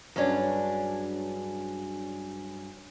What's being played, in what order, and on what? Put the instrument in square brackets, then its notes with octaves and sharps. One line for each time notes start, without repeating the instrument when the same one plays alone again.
[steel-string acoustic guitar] G2 F#3 G#3 C#4 D4